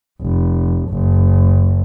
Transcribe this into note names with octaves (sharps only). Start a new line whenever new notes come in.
F1
F#1